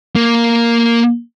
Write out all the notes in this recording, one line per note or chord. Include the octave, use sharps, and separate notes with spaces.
A#3